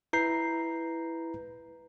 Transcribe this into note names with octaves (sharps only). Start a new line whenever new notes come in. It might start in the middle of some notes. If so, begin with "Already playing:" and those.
E4 B4 A#5 G6 C7